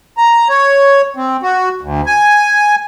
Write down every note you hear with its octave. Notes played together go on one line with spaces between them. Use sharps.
A#5
C#5
C4
F#4
D2
G#5